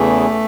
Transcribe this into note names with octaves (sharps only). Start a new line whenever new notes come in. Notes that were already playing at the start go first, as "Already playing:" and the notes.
Already playing: E2 C#3 E3 A3